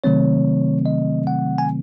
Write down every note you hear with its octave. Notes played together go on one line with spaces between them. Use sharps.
C3 D#3 F#3 A3 C4 C#5
D#5
F#5
G#5